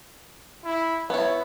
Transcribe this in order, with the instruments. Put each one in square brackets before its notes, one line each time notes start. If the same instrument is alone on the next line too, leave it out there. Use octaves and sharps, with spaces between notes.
[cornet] E4
[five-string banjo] B3 E4 [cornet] C#5